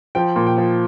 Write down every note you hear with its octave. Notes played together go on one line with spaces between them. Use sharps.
F3 G5
A#2
G5
F3